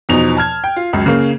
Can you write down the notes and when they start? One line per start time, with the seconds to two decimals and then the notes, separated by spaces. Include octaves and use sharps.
0.09 E2 B2 F3 D#4 F7
0.37 A5 F6 G#6
0.64 G5
0.76 F4
0.93 C#2 F#2
1.06 C#3 A#3